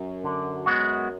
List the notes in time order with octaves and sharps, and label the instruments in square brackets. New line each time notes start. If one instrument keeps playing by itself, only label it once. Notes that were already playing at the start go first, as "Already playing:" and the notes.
Already playing: [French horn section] F#2
[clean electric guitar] D3
G#3 B3 F#4